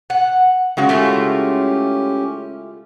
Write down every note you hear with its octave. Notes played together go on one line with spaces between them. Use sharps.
F#5
C#3 G#3 F#4
A3 C#4 E4 F4 G4